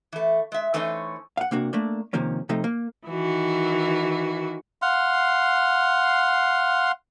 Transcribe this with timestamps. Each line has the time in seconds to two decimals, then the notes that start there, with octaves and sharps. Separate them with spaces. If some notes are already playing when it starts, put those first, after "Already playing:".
0.12 E3 A3
0.52 G#3 E5
0.74 E3 A3 C#4 D#4 C5
1.37 F5 F#5
1.51 C3 A#3 D4 F#4
1.73 A3 A#3 D4
2.13 C3 D#3 F3 A#3 C#4
2.49 C3 F3 A3 D#4
2.64 A#3
3.09 D#3 E3 F#4
4.82 F5 F#5 C6